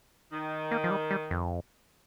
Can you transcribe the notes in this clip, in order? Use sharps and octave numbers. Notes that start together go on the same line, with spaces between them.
D#3
A#3
F3
G3
G3
F2